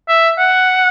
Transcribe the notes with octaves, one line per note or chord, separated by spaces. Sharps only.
E5
F#5